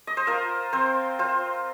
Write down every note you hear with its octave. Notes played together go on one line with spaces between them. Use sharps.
D#5
C5
F4 A#4
C4 C5
F4 C5